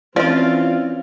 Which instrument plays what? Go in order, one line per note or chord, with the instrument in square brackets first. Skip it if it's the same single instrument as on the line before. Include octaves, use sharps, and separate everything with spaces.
[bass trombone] E3 [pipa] F3 F4 [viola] C4 C#4 [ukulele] D5